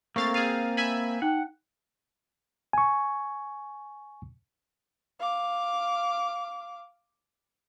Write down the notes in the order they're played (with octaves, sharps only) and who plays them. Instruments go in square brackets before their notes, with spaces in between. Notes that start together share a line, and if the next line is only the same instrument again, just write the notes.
[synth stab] A3 F5 A6 [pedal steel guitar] A#3 C4 [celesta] C#6
[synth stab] G#4 F5 [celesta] A6 D#7
[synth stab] E5 G#5 B5
[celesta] D#4 G5 F#6 [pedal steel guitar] F#5
[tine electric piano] G#5 C#6
[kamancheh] F5 D6